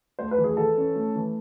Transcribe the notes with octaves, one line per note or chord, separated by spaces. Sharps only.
A3 C5
B4
E3
G#4
E3 A4
C#4
A3
E3